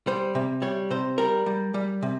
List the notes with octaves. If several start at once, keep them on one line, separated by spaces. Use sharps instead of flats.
G3 C5
C3
G3 C#5
C3 C5
G3 A#4
G3
G3
C3